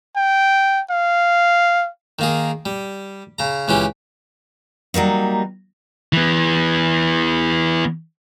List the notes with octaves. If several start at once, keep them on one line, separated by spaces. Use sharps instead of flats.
G5
F5
D#3 A#3 G#4
G3
C#3 A#5
C#2 E3 C#4 G4
F#3 G3 A#3 D#4
E3 B3